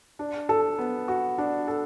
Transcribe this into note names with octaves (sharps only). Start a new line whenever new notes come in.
D4
A4
B3
F#4
D4
A4